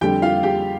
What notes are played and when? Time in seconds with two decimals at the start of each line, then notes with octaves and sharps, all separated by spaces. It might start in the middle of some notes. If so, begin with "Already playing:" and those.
0.01 F2 D3 G3 G4 G5
0.22 F4 F5
0.43 G4 G5